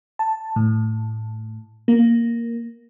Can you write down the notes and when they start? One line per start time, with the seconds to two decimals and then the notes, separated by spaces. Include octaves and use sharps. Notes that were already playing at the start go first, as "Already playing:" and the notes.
0.19 A5
0.56 A2
1.88 A#3